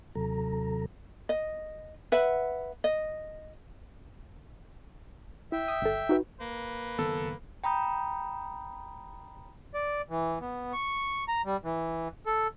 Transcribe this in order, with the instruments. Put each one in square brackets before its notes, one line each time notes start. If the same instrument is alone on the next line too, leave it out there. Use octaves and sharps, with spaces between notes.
[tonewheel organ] D#2 C3 F#3 A4 A#5
[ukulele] D#5
B4 E5 F#5
D#5
[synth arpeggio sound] E4 [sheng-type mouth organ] E5 G5
[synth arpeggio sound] D#6
G1 A4
D#4 F#4 B4
[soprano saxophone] A#3 [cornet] B4
[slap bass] F#1 D#3 B3 [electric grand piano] A4
[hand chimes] G5 A#5 B5 D#6 G6
[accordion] D5
E3
B3
C#6
A#5
G3
E3
A4